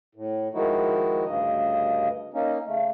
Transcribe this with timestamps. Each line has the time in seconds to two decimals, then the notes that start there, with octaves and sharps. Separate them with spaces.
0.15 A2
0.54 D#3 F3 G#3 D#4 E4 F#4
1.25 D2 G2 C#3 D#5
2.34 A#3 C#4 D#4
2.67 C#3 A3